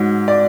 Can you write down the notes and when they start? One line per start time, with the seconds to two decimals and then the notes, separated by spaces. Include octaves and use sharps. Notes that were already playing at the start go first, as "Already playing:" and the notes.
Already playing: G#2 F#3
0.28 D5